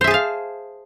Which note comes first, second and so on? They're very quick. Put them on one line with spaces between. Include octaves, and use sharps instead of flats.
C5 E5 G#4 A5 F5